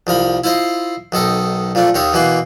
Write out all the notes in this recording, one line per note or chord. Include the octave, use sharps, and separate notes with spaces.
C2 F3 A#4 B5
E4 F4 C5 D#5
B1 D#3 A4 D#5
A#2 F3 A3 D4
D#2 D#3 D#4 C#5 E5
B2 E3 A#3 B4 C6